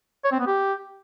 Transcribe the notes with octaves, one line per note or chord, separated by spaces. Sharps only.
C#5
C4
B3
G4